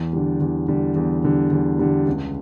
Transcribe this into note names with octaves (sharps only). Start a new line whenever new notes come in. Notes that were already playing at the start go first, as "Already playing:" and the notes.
Already playing: E2
D3 G3
E2
D3 G3
E2
D3 G3
E2
D3 G3
C#2